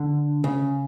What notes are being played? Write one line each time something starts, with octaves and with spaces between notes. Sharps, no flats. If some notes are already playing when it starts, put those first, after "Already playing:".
Already playing: D3
C#3